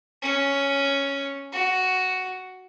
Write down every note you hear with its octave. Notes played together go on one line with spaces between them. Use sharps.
C#4
F#4